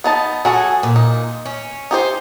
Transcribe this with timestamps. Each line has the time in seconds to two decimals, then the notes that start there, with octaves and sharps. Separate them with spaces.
0.04 B3 D#4 A5
0.45 F#3 F#4 G#4 A4
0.83 A#2
0.96 D#4
1.45 C#4
1.91 D#4 G4 C5